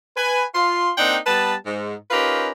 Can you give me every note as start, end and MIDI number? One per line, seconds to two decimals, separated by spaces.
0.16 0.44 71
0.16 0.44 80
0.55 0.90 65
0.55 0.90 84
0.97 1.16 58
0.97 1.16 60
0.97 1.16 62
0.97 1.16 63
0.97 1.16 78
0.97 1.16 79
1.26 1.54 55
1.26 1.54 59
1.26 1.54 71
1.26 1.54 81
1.65 1.95 44
2.11 2.50 61
2.11 2.50 63
2.11 2.50 65
2.11 2.50 67
2.11 2.50 70
2.11 2.50 71